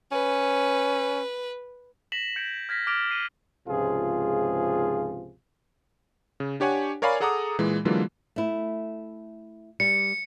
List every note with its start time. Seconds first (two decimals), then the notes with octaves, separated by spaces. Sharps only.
0.12 C#4 B4
2.12 A#6 B6 E7 F#7
2.36 G6 G#6 C#7 D7
2.69 F6 G#6 A#6 B6
2.87 D6 F6 A6 D7 F7
3.10 C7 D#7 G7
3.68 C#2 G#2 C3 F3 F4 G#4
6.40 C#3
6.60 D4 G4 C#5 F#5 G#5
7.02 A#4 C#5 D5 F5 G#5 B5
7.20 G#4 A4 F#5 A#5 D6 D#6
7.58 A#2 E3 G#3
7.85 D3 E3 F#3 G#3 A#3 F4
8.36 A3 E4
9.80 G3 C#7